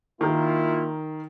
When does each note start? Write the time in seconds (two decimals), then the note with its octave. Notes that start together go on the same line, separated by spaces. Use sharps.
0.21 D#3 A#3 E4 F4 A#4